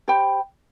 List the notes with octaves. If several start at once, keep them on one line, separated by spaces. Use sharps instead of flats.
G4 C5 G5 B5